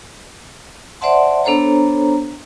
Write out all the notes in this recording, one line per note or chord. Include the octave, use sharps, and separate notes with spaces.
C5 D5 E5 F#5 A5 C6
B3 D4 A4 C5 C#5 A#5